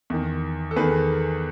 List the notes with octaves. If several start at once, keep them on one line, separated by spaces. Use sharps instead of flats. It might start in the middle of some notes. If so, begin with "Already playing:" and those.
E2 D#3
A4
E2 D#3 G#4 B4